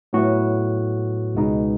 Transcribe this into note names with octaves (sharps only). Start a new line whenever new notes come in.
A2 F#3 B3 F#4
C#2 B2 G#3 D#4